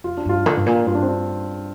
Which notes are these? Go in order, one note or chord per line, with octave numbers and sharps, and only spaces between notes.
F2 F4
D4
G2 F4
D3
G2
A#2
G2 F4
D4
C4
D4